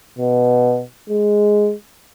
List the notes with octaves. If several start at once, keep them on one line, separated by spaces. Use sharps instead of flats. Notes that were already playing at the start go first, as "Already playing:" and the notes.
B2
G#3